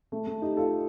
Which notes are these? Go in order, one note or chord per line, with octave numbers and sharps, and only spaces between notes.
A3
A3
D#4 G4
F4 A4